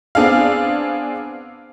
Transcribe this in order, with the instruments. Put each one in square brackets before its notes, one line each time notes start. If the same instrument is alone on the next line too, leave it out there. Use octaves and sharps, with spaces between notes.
[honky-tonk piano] B3 C4 D4 G#4 F5